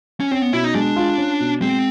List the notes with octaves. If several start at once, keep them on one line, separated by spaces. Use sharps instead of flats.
C#4
C4 C#4
B3
B2 E4
D#4
G#3 D4
F4
C#4
B2
G#3 C4